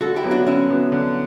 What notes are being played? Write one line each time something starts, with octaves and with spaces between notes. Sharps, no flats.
D3 F#4 A4
E4 G4
F#3 B3
D4 F#4
D3 C#4 E4
F#3 B3
D3